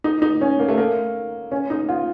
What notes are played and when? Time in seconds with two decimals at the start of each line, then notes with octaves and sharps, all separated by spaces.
0.04 D#4
0.22 D#4
0.41 C#4
0.59 A#3
0.68 A3
0.78 A#3
1.51 C#4
1.70 D#4
1.89 F4